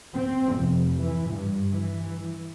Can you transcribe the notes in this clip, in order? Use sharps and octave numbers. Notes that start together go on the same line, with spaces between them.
C4
F1
E3
G2
E3